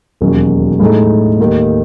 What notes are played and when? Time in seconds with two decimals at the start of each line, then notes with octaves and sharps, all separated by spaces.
0.21 E1 D#2 D#3 F#3 C#4
0.80 A2 G#3 D#4 A4
1.39 D#2 D#3 A3